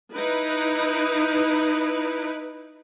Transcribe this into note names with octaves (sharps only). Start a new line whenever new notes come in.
D#4 E4 B4